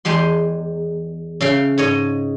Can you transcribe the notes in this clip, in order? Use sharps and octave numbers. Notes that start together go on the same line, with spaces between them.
E2 G#3 G4 C6
C#3 E5 F5 G5
G#2 C#5 D#5